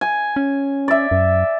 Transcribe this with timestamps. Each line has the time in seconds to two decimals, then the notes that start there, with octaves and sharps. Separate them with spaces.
0.01 G#5
0.36 C#4
0.88 D5 E5
1.11 F#2